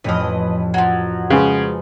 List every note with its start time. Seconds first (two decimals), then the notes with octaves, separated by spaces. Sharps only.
0.04 A1 F2 B4 D#5 F6
0.74 F3 F#3
1.30 C#3 G#3 G#4 B4 C5 G#5